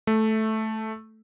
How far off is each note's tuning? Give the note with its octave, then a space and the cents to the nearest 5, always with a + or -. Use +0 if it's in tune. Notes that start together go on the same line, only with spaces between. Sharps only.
A3 -5